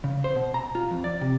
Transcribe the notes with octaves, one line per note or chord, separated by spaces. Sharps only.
C#3
C5
B2
A#5
F4
F2
D5
C3